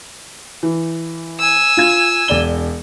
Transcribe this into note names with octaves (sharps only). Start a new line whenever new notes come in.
E3
G#5 E6
F4 G#6
E1 D5 G7